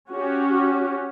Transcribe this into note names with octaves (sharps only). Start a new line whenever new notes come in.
C#4 F#4 G4